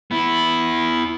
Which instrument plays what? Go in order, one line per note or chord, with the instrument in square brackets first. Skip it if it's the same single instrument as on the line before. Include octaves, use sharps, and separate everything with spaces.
[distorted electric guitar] B3 E4